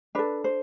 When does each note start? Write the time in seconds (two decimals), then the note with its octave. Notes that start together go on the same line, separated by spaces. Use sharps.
0.15 D4 A4 B4
0.44 C5